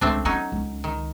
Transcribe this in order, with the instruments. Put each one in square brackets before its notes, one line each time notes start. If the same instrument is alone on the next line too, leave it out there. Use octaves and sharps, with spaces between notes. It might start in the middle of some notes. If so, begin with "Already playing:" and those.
[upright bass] C#2 [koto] A3 C4 D4
[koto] F#3 C#4 D#4 [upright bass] B3
[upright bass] C#2
[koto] D#3